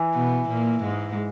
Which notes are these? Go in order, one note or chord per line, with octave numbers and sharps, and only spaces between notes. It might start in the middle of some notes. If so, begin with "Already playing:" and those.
Already playing: E3
B2 B3
A#2 A#3
G#2 G#3